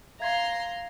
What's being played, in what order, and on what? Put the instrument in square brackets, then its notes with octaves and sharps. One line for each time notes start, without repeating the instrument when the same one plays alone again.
[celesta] E5 F5 G#6 [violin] A#5 C6